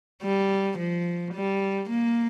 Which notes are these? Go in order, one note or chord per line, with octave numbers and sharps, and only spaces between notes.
G3
F3
G3
A#3